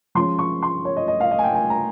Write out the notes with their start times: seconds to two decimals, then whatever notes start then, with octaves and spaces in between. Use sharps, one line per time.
0.15 F3 G#3 C#4 C6
0.39 C#6
0.63 C6
0.85 C#5
0.96 D#5
1.08 D#5
1.20 F5
1.31 D#5
1.39 G#5
1.44 G5
1.55 G#5
1.70 A#5